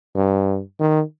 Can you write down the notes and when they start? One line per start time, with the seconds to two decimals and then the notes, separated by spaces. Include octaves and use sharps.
0.15 G2
0.79 D#3